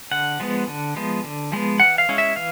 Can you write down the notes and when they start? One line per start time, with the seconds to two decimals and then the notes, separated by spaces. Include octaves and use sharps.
0.11 D3 F#5
0.40 F3 G#3 B3
0.68 D3
0.96 F3 G#3 B3
1.24 D3
1.52 F3 G#3 B3
1.80 E3 F#5
1.98 F5
2.09 G#3 C#4 E4
2.18 E5
2.36 E3 F5